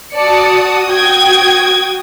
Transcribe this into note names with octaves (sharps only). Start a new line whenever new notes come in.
F#4 D5 A5 D#6 C#7
G5 G#6